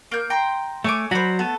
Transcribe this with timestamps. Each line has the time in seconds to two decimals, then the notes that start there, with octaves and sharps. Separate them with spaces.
0.11 A#3 G6
0.30 G5 A#5 C6
0.84 A3 C#5 G#5 D6
1.11 F#3 F#4 C5 D5 B5
1.39 A3 B3 A4